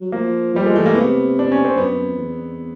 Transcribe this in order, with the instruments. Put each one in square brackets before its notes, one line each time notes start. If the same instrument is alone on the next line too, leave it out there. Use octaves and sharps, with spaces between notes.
[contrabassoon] F#3
[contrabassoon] F3 [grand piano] A#3
[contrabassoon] F3 [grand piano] G3
[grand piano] G#3
[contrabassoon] E3 [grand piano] A3
[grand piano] A#3
[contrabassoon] C3 [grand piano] B3
[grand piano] D4
C#4
C4
[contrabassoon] F#2 [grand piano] B3
[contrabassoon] F2
E2